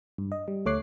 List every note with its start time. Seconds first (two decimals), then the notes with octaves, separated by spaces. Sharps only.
0.18 G2
0.32 D#5
0.48 G3
0.66 D2 A3 C#5 D6 F#6 C7